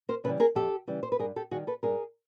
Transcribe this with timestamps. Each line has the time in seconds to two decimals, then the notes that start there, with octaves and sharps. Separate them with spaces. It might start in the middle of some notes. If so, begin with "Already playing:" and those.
0.09 A#4 C5
0.24 C#3 A4 B4
0.27 E3 G3
0.40 G#4 A#4
0.55 F2 G4 A4
0.87 C#3 E3 G3
1.03 C5
1.12 B4
1.19 G2 G#4 A#4
1.36 G4 A4
1.51 D#3 G3 F#4 G#4
1.67 A4 B4
1.83 G2 G#4 A#4